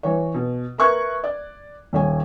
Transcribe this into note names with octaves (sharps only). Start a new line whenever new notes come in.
E3 C#5
B2
A#4 B4 E5 C#6 F#6 G#6
D5
D#1 C#5 G#5